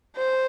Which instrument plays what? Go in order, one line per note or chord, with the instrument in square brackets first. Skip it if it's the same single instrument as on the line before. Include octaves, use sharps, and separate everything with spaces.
[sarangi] C5